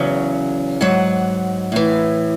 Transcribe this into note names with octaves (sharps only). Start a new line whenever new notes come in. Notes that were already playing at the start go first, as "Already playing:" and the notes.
Already playing: E2 C#3 F#3
G#2 F#3 F#5
A2 E3